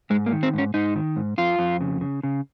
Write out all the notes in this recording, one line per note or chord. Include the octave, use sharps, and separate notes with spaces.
G#2 G#3
A#3
D#3
C4
G#2 C#4
G#2 D#4
D#3
G#2
F2 F4
F2
C#3
C#3
C#3